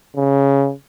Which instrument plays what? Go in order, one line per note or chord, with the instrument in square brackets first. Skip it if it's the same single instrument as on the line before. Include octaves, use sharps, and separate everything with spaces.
[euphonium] C#3